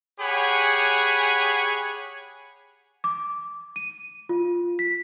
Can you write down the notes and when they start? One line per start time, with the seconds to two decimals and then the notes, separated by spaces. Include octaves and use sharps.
0.20 G4 G#4 C#5 F#5 G#5 B5
3.04 D6
3.76 D#7
4.29 F4
4.79 B6